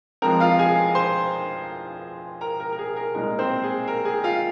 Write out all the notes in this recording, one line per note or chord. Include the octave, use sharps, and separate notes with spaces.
F1 F2 F3 G#3 C4 A#4 A#5
F4 F5
G#4 G#5
C5 C6
A#4 A#5
A#4
A#4
G#4
A#4
C2 A#2 G#3 D#4 A#4
C4 C5
G#4
A#4
G#4
F4 F5